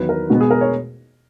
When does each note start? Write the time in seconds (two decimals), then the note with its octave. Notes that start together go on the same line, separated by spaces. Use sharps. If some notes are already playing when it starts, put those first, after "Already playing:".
Already playing: E2 D#3 F#3 B3 E4 B4
0.09 A#4
0.30 B2 G#3 B3 F#4
0.40 G#4
0.51 A#4
0.61 C#5